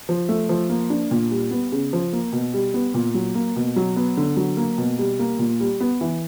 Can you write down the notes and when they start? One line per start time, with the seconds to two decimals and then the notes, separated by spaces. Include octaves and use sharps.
0.09 F3
0.29 A3
0.49 F3
0.69 A#3
0.90 D4
1.11 A#2
1.31 G3
1.51 B3
1.72 C#3
1.93 F3
2.13 A#3
2.32 B2
2.54 G3
2.74 B3
2.94 A#2
3.14 F#3
3.35 A#3
3.56 B2
3.76 F#3
3.96 B3
4.17 D3
4.37 F#3
4.57 A#3
4.78 B2
4.99 G3
5.19 A#3
5.39 A#2
5.60 G3
5.80 B3
6.01 E3